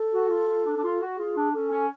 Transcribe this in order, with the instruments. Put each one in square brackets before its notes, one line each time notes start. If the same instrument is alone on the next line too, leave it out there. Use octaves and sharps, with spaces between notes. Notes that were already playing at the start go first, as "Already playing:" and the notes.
Already playing: [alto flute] A4
[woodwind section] F#4
F4
F4
D4
D4
F4
F#4
[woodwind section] F4 [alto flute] G#4
[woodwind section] D4
[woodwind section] C#4 [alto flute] A4
[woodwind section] C#4